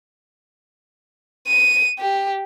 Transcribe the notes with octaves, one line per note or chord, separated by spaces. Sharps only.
D#7
G4